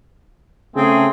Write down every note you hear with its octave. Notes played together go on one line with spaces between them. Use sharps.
C#3 A3 C4 G#4